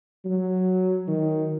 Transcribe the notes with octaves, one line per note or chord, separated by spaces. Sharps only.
F#3
D#3